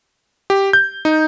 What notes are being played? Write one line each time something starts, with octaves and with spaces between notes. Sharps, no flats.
G4
G6
D#4